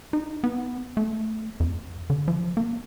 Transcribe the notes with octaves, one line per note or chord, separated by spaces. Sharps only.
D#4
B3
A3
F2
D3
F3
A#3